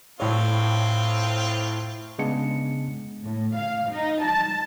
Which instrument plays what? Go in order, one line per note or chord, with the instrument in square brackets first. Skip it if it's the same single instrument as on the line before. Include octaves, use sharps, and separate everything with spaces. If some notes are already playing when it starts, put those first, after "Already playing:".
[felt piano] A2 C#5 [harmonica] C4 F4
[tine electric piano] C#3 G#3 B3 D4 C#7
[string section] A2
F5
D#4
A5